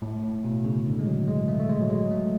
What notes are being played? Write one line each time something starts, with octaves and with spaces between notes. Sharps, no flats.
A2
A2
B2
C#3
D3
G#3
F#3
G#3
A3
A3
G#3
F#3
G#3
A3